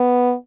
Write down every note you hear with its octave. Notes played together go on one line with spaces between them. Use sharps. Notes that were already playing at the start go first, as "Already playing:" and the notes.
Already playing: B3